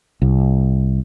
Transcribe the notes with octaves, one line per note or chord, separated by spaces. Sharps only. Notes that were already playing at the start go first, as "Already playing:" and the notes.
C2